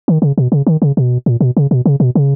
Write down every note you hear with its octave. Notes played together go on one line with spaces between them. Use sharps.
D#3
C#3
B2
C#3
D#3
C#3
B2
A#2
B2
C#3
B2
C#3
B2
C#3